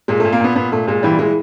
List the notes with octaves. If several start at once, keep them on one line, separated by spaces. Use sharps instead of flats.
A#2 G#3
A3
A#2
A#3
A#2 B3
A#2 B3
A#2 A3
A#2 G#3
E3 G3
E3 G#3